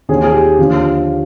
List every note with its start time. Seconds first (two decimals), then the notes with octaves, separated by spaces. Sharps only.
0.09 D#2 D#3 G#4
0.23 G#4
0.33 G4
0.59 D#2 D3 F3 F4